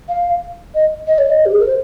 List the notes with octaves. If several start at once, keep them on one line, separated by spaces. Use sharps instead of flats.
F5
D#5
D#5
C#5
D#5
G4
G#4
A#4
C5